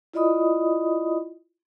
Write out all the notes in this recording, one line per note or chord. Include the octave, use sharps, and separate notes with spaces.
E4 F4 D5 D#5 B5 D#6